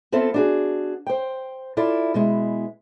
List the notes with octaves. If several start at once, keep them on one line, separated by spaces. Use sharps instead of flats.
B3 C4 F4 A4 E5
D4 F#4 G#4
C5 G5
E4 F4 A4 D5
B2 G#3 E4